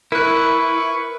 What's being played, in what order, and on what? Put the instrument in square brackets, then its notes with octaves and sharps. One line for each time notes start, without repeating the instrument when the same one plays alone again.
[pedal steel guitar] E4 [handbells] A#4 F#6 [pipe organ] B4 C#6